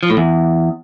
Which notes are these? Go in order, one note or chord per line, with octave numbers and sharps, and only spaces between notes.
F3
A2
E2